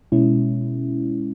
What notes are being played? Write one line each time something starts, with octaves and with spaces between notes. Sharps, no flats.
B2 G#3 C#4 E4